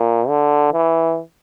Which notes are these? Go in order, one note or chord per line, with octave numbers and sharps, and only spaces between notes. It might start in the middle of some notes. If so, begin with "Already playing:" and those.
Already playing: A#2
D3
E3